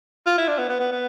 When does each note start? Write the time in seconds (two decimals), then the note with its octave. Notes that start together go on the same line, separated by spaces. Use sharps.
0.26 F4
0.38 E4
0.48 D4
0.58 B3
0.69 B3
0.80 B3
0.92 B3